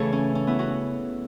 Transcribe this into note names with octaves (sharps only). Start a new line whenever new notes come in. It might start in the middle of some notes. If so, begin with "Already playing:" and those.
Already playing: C#3 E3 A3 A4 C#5
C#4
C#4
B3 E4
C#4 F#4